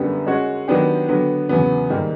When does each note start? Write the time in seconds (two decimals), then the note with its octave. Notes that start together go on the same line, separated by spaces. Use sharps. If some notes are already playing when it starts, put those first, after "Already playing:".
Already playing: F#2 D3 G3 B3
0.27 G#3 C#4 F#4
0.68 D#3 F#3 B3 D4 G4
1.09 D3 F#3 B3
1.49 E2 C#3 F#3 B3
1.90 G#2 D#3 G3 A#3